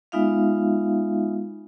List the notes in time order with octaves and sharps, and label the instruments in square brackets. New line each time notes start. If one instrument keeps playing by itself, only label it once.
[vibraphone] G#3 B3 D#4 F4 E5 F5